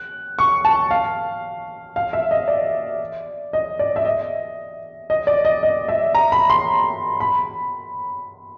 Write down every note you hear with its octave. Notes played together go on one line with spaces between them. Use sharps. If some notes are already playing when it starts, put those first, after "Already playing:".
Already playing: F#6
C#6
A5
F5
F5
E5
D#5
D5
D#5
D5
E5
D#5
D#5
D5
D#5
D#5
E5
A#5
B5
C6
B5